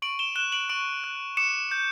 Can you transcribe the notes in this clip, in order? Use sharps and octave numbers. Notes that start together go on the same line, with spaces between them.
C#6 D7 F#7
E7 G7
F#6 E7 G7
D7 F#7
C#6 D7 F#7
F#6
D6 C#7 E7
G6